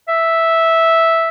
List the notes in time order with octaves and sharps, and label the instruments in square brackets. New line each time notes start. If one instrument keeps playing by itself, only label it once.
[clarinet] E5